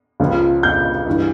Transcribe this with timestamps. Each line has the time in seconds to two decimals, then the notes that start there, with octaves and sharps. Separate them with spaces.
0.20 C#2 C#3 F3
0.63 G6
1.07 G2 E3